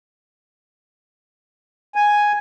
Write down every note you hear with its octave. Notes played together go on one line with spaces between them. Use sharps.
G#5